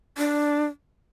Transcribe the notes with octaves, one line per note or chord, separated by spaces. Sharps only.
D4